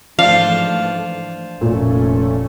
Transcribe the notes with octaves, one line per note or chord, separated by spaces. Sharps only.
G#2 E3 F3 A3 D4 F5
F1 A#2 A3 C#4